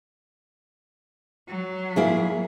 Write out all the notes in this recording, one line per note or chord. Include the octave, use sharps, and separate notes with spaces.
F#3
A#3 E4 G#4